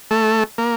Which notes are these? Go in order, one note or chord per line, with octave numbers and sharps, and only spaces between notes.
A3
A#3